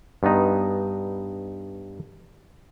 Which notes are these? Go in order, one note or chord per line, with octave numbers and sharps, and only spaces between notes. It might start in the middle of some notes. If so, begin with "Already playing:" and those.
G2 B3 D#4